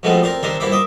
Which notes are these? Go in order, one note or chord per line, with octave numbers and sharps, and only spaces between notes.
B2 F3 G#3 A3 B3 C4
C4 A#4 C5 D5
C3 D#3 D4 A#4 E5 C6
G2 A#2 E4 C5 B5 D6
D#5 E5 D6